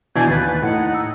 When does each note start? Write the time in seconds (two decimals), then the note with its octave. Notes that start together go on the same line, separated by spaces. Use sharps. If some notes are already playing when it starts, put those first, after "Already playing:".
0.16 B2 E3 D4 G#5 G6 G#6
0.29 D#2 B4 A6
0.63 A2 D#4 F#5
0.94 E6